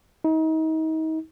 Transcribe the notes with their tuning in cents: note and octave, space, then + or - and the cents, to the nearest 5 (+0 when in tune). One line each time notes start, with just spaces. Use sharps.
D#4 +35